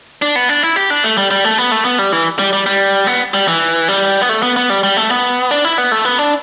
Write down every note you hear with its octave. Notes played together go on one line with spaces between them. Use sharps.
D4
B3
D4
E4
G4
D4
A3
G3
G3
A3
B3
A3
B3
G3
E3
G3
G3
G3
B3
G3
E3
G3
B3
A3
B3
B3
G3
G3
A3
B3
D4
E4
B3
A3
B3
D4